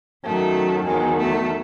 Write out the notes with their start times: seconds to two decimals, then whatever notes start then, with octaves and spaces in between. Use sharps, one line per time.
0.24 F#2 D#3 F#3 A3
0.86 E2 D#3 F#3 G#3
1.17 A3